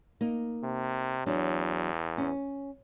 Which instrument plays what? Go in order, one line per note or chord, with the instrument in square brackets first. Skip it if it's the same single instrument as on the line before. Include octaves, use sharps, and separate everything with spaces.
[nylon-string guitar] A#3 D#4
[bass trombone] C3
[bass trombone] E2 [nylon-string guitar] F#3 D4
[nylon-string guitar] C#4